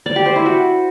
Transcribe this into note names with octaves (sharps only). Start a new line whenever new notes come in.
D5
G4
C5
E4
F#4